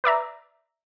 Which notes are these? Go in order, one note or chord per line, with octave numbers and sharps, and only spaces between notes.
B4 D5 E5 A#5